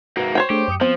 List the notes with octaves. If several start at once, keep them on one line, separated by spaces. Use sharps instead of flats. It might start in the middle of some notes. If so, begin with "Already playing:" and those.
G#2 A#3 F#4 B4 E5
C5 C#5 G5
A3 D4 G4 G#4
F#2 D#6 C#7
F3 B3 C4